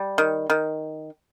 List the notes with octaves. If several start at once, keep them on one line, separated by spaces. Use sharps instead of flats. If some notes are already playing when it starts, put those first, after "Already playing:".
Already playing: G3
D#3
D#3